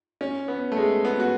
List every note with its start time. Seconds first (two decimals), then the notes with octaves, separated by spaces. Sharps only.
0.21 C#4
0.48 B3
0.72 A3
0.77 G#3
1.05 B3
1.20 F#4